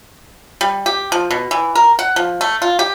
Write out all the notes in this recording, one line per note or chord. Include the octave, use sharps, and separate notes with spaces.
G3
G4
F3
B2
E3
A#4
F#5
F3
A3
F4
G4